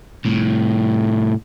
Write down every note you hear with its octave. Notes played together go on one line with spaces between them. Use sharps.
C2 A2